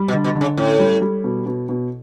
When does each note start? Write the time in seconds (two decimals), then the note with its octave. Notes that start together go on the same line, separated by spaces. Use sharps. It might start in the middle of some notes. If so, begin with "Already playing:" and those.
Already playing: G3
0.08 B2
0.13 D3
0.24 B2
0.35 D3
0.41 C#3
0.57 A2 C#4
0.79 G3
1.02 G3
1.24 B2
1.46 B2
1.69 B2